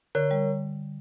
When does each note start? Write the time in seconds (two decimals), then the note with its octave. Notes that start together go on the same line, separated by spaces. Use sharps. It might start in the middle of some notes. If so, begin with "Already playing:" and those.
0.15 D3 A#4 C#5
0.31 G3